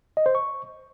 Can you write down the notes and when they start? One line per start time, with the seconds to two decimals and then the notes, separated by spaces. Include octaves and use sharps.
0.17 D#5
0.26 C5
0.35 C#6